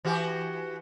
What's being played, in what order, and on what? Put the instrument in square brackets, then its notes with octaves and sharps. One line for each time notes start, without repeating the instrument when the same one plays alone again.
[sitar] E3 F#4 G4